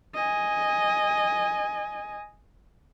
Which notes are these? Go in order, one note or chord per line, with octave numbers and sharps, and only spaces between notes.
D#5 G#5